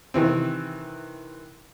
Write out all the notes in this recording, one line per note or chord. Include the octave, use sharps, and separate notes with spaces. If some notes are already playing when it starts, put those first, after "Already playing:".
C3 D#3 E3 C4